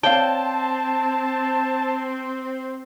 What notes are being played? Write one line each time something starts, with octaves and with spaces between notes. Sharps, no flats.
C4 C#5 D5 F5 G5 A5